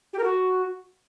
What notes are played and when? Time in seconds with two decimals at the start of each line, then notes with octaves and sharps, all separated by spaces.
0.13 G4
0.18 A#4
0.23 F#4